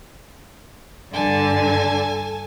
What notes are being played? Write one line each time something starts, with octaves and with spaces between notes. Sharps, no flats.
G2 D3 A4 G#5 A5